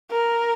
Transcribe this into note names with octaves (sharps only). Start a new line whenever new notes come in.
A#4